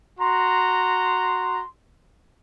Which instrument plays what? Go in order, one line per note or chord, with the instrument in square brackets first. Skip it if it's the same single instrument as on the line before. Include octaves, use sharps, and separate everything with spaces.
[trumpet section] F#4 A#5 C6